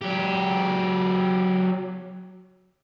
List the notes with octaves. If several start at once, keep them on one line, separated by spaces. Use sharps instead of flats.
F#3 G4